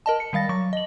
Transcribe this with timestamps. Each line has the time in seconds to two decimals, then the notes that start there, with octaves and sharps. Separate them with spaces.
0.06 A#4 D#5 A5
0.20 C#7
0.33 D#3 G3 F5 A6 A#6
0.49 F#3 C#6
0.73 D#5 F#7